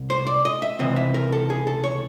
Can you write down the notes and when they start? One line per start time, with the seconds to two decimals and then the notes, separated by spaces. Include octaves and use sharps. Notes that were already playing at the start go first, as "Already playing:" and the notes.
Already playing: C2
0.10 C5
0.27 D5
0.45 D#5
0.62 E5
0.79 C#2 C3 E3 C4 D#5
0.96 E5
1.14 A#4
1.32 A4
1.50 G#4
1.67 A4
1.84 C#5